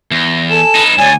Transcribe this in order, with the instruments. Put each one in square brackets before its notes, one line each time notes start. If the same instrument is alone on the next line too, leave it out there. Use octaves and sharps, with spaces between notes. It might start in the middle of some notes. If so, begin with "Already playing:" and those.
[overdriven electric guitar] E2 [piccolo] A#6
[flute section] A4 G#5 [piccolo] E7
[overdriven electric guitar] D#4 B4
[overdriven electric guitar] D2 G#2 [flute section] C#5 D5 [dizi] G#5